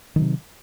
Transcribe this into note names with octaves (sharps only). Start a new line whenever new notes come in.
C3 D#3 F#3